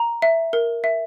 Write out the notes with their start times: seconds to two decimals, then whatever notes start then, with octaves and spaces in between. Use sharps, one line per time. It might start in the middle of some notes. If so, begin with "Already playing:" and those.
Already playing: A#5
0.22 E5
0.53 A#4
0.84 E5